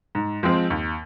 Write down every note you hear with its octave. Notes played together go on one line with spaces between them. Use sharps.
G#2
F3 G#3 C4 F4
D#2